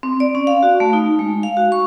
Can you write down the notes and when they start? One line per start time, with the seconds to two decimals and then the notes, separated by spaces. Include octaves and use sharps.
0.03 C4
0.20 D5
0.35 C#4
0.47 F5
0.63 F#4
0.80 A3
0.93 D#4
1.19 G#3
1.43 F5
1.57 F#4
1.72 C#6